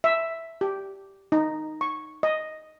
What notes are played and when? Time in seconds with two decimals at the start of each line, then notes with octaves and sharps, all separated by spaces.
0.04 E5
0.61 G4
1.32 D#4
1.81 C#6
2.23 D#5